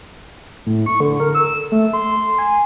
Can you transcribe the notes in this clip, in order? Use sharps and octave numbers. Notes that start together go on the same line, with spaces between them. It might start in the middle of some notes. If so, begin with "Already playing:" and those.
A2
C#6
D3
A#4
E6
A3
C6
G#5